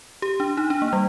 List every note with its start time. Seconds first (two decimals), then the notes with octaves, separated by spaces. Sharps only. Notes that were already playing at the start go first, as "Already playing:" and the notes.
0.22 G4
0.40 D4
0.57 D#4
0.70 D4
0.82 A#3
0.93 G3